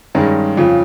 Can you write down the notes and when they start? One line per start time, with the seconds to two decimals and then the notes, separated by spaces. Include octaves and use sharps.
0.15 G2 D#3 G#3 C#4
0.57 F2 C#3 F3